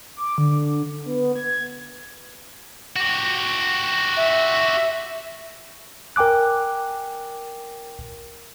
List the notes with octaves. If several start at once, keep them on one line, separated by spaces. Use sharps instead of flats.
D6
D3
B3
G#6
F#4 G4
E5
A#4 G5 G#5 D6 F#6